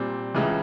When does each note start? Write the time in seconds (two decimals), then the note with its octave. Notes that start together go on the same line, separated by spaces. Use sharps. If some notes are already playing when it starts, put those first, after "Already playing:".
Already playing: A#2 G3 C4
0.34 C#2 C#3 E3